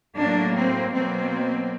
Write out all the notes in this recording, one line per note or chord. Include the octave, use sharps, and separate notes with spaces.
A2 F#3 A#3 D4
C4
B2 F#3 A#3 C4